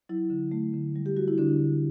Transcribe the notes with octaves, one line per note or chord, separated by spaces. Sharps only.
F#3 E4
D3
A3
D3
G3
G4
G3 F#4
E4
D3 D4
D3